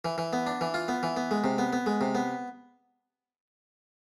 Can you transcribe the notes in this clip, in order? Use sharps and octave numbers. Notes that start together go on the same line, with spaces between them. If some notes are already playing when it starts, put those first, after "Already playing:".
E3
E3
B3
D4
E3
F4
B3
E3
B3
G#3
C3
B3
B3
G#3
C3
B3